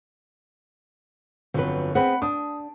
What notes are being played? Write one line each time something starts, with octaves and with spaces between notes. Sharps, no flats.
G1 F2 F#3 B4
B3 C4 G#4 F#5 B5
D4 D#6